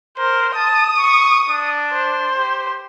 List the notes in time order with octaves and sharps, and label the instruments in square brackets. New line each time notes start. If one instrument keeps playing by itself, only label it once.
[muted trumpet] A#4 [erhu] C5
[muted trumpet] A5 [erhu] D#6
[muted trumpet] C#6
D4
[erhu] C5
[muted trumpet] G4